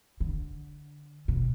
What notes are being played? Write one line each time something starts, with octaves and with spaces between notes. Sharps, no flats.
D3
B2